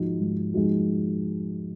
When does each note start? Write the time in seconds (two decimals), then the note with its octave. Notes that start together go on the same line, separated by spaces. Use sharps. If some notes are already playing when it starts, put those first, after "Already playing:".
Already playing: G#2 F3 G#3 D#4 F#4
0.20 G#2
0.54 F3 G#3 D#4 F#4